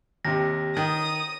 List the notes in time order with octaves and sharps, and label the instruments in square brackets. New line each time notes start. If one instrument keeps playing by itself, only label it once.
[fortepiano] D#2 C3 [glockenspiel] A#6
[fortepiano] D#3 [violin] D#6